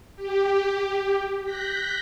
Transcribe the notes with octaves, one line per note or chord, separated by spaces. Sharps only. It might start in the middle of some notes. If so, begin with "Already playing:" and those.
G4
F#6 G6 A#6 B6